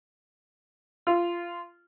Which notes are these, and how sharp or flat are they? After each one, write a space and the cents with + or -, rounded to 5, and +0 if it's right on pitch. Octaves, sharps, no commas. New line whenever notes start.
F4 -15